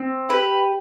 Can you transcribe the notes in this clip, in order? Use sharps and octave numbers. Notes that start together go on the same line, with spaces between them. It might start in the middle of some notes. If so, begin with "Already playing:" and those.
Already playing: C4
E4 G4 B4